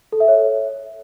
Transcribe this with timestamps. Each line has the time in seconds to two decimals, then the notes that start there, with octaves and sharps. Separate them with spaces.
0.12 A4
0.20 E5
0.28 C#5